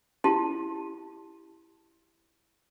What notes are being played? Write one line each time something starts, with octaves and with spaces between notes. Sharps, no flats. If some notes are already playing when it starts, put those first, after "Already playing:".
E4 F4 G4 A5 C6